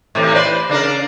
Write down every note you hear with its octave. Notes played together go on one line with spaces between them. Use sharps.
A2 C3 E3
B4 C5 D5
C#3 D4 A#4